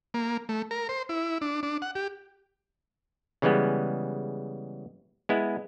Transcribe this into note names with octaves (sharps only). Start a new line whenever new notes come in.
A#3
A3
A#4
C5
E4
D4
D4
F#5
G4
C#3 E3 G3 G#3 B3
G#3 B3 E4